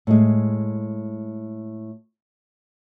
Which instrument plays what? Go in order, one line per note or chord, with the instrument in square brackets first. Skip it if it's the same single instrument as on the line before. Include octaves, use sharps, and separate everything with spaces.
[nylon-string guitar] A2 G#3